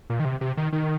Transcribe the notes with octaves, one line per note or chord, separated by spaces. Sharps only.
A#2
D#3
C3
C3
D#3
D#3